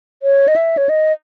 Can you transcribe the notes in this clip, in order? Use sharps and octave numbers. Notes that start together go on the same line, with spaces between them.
C#5
D#5
E5
C#5
D#5